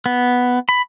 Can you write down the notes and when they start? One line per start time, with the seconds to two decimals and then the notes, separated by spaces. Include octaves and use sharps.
0.06 B3
0.69 B5